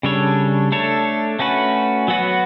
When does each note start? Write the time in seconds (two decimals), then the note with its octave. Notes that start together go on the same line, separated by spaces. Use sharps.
0.03 C#3 G3 D4 A4 C#5
0.72 A3 D4 A4 C#5
1.39 A3 C#4 F#4 B4
2.08 F#3 B3 F#4 B4